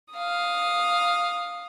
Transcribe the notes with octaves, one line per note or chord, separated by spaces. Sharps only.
F5 D#6